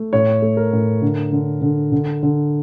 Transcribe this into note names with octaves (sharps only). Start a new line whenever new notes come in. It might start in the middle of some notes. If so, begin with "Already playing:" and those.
Already playing: A3
A2 C#5
A3
A#4
A2
D3
D3
D3
D3
D3